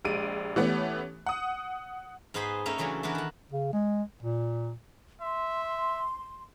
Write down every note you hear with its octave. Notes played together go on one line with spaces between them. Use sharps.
A#1 G#3 G4 D7 D#7
E3 A3 B3 C#4 G4
F#5 D#6
G#2 B3 D#4 G#4 C5 B5
A3 A#3 C#4 D#4 A#4 C#5
C#3 E3 F#3 A3 D4
E3 B3 D4 F#4 A#4
D#3 F#5
C#3
G#3
A#2
E5 C6